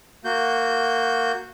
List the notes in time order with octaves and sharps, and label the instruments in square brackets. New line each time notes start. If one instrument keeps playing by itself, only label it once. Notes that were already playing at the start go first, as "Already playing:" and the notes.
[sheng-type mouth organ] A#3 F#4 G6